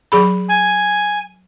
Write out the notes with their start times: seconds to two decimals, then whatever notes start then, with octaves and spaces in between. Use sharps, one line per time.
0.12 F#3 G#4 B5
0.49 G#5